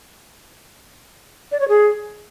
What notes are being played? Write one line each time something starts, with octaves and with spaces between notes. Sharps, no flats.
D5
C#5
G#4